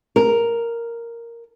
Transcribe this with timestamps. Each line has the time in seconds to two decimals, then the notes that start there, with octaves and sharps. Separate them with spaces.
0.16 A#4